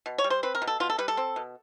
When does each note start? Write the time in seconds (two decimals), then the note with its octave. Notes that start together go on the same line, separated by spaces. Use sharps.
0.06 B2
0.18 C#5
0.24 G3
0.30 C5
0.43 C4 B4
0.55 A#4
0.62 B2
0.67 A4
0.80 B2 F4
0.90 A4
0.98 G3 B4
1.08 A4
1.17 C4
1.36 B2